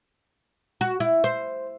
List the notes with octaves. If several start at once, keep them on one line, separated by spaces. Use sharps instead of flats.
F#4
E4
C5